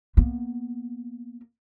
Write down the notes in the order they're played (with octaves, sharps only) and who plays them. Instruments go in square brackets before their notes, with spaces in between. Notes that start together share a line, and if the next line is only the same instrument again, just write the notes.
[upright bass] A#3 B3